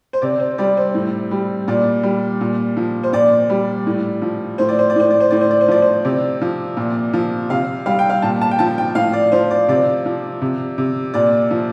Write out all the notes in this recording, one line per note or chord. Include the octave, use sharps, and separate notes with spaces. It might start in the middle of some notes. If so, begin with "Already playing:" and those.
C5
C3 D5
C5
G3 D5
C5
A2
G3
A#2 D5
G3
A#2
F3
C5
A#2 D5
G3
A2
F3
A2 C5
D5
C5
D5
A2 C5
D5
C5
A2 D5
C5
D5
C5
F3 D5
C5
C3 D5
F3
A#2
F3
C3 F5
G3 F5
G5
F5
A#2 A5
A5
G5
F3 A5
G5
A2 F5
D5
F3 C5
D5
C3 D5
F3
C3
C3
A#2 D5
F3